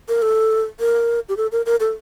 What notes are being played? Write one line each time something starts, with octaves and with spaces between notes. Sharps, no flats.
A#4
A4
A#4
G4
A4
A#4
A#4
A4